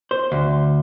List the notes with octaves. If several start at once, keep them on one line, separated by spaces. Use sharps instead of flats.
C5
D2